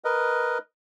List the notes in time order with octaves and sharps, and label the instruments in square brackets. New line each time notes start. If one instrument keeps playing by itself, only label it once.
[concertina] A#4 B4 D#5